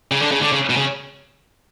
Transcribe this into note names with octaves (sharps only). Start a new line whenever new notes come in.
C#3
D3
C#3
D3
C#3
B2
C#3